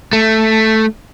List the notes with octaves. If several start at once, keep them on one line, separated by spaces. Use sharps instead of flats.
A3